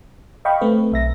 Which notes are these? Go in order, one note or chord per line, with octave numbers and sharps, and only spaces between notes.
D#5 F5 G5 B5 C#6
A3 C4 B4
B1 E5 A#6